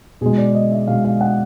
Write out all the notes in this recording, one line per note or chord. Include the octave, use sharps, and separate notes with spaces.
B2 G#3 G#4
D5
D#5
E5
B2 G#3 F5
F5
F#5